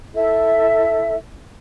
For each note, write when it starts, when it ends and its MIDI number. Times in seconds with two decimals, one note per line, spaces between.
0.13 1.14 64
0.13 1.14 69
0.13 1.14 76